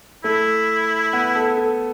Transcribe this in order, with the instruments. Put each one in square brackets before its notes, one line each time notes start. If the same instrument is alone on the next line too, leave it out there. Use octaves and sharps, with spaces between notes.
[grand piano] A3 [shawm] E4
[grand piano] B3
A4
A4